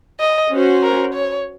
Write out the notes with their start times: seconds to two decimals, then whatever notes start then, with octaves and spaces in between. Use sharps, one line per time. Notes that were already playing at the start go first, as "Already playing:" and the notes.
0.20 D#5
0.51 C#4 F#4 C5
0.83 A#4
1.14 C#5